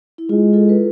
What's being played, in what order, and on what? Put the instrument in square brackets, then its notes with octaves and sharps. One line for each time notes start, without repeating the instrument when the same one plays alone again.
[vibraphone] E4
[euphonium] G#3 [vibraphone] F4
[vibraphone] F4 A4
B4